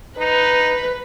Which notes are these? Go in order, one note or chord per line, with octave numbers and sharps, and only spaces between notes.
D#4 B4